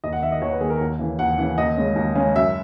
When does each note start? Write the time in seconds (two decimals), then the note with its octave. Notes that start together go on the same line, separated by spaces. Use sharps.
0.04 D#2 D#5
0.13 F#5
0.23 D#3 A#3 E5
0.32 D#5
0.42 D#2 C#5
0.52 B4
0.60 D#3 A#3 G#4
0.70 A#4
0.81 D#2
0.99 C#3 E3
1.19 D#2 F#5
1.38 C#3 E3
1.58 D#2 D#5
1.77 C#3 G#3 C#4
1.96 D#2
2.15 C#3 G#3 C#4
2.36 F#2 E5